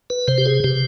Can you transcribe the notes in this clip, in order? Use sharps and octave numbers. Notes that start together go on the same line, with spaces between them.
B4
C3 C5
G4
G#4
C3 G4